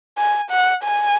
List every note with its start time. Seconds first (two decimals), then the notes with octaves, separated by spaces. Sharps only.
0.18 G#5
0.50 F#5
0.84 G#5